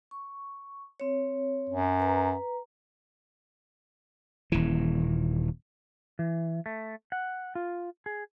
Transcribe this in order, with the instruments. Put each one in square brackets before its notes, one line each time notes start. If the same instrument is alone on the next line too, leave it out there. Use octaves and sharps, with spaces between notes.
[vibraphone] C#6
C4 C#5
[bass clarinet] F#2
[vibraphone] B4 A#5
[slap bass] D#1 E3
[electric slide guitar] E3
A3
F#5
F4
G#4